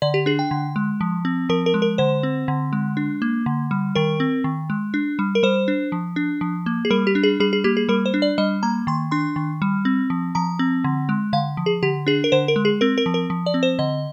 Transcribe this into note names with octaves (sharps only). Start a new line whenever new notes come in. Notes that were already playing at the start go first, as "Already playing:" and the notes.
D3 D5
G4
D4 G#4
G5
D3
G#3
F3
C4
F3 A#4
A#4
G#3
A#4
D3 C5
C4
D3
G#3
D4
A#3
D3
G3
D#3 A#4
C4
D#3
G#3
D4
G3
A#4
G3 C5
D4
F3
D4
F3
A#3
G#4
G3 A#4
G4
D4
G#4
G3 G#4
G#4
A#3 G4
G#4
G3 A#4
C5
D4
D5
G3 D#5
A#3 A#5
D#3 C6
D4 C6
D#3
G3
C4
F3
F3 A#5
C4
D3
G#3
D3 F5
F3
G#4
D3 G4
D4 G#4
A#4
D3 C5
A#4
G#3
G#4
C4 A#4
A#4
F3
A#4
F3
D5
C4
C5
D3 D#5